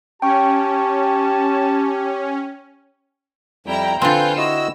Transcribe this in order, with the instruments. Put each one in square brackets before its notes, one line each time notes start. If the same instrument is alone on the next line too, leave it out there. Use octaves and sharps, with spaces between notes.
[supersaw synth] C#4 [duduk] G4 [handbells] G5 C#6 [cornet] A5
[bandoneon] F2 G3 [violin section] E4 G5 A#5
[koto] D3 C4 [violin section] F4 A4 G6 [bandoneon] B4 G#5
[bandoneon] E4 F#4 D#5 [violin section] E6